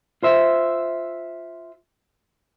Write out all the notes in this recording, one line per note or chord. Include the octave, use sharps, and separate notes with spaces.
F4 C5 E5